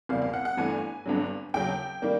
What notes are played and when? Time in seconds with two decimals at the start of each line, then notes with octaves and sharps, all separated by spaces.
0.09 F#1 E2 B2 G3 A#3 F5
0.22 F5
0.34 F#5
0.45 F#5
0.57 G1 G2 E3 A3 G#5
1.06 G1 G2 D3 F#3
1.54 D#2 C#3 F#3 G5
2.02 D#3 G3 A#3